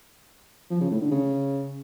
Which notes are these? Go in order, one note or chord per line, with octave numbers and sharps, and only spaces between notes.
F3
C#3
A2
D3
C#3